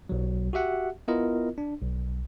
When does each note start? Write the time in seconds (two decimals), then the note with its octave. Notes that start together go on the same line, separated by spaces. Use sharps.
0.09 B1 F#3
0.53 F#4 G4 E5 F#5
1.08 B3 E4 F4 A#4 D#5
1.58 D4
1.82 B1